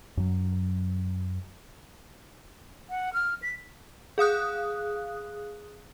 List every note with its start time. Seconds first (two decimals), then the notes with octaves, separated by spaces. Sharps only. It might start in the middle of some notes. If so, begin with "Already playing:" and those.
0.17 F#2 F#3
2.90 F#5
3.13 F6
3.42 B6
4.18 G#4 F5 D#6 F#6